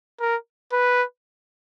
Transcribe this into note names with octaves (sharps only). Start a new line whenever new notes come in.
A#4
B4